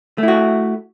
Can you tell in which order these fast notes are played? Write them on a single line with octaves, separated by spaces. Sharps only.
A3 E4 F#4